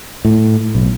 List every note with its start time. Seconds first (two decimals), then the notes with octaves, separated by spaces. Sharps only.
0.25 A2
0.75 B1